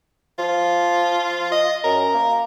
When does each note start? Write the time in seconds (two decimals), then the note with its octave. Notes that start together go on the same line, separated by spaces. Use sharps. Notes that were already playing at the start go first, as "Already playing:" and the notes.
0.39 F3 F4
1.52 D#5
1.84 F#2 A#4
2.14 A#3